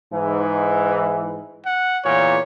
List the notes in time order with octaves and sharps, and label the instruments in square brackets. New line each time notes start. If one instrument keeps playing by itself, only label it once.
[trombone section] G#2 E3
[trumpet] F#5
[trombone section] E2 A#2 [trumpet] C#5